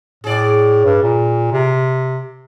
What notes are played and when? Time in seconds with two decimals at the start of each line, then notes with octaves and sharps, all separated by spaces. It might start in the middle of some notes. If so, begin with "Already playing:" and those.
0.24 A2 G#4 D5
0.85 G2
1.03 A#2
1.52 C3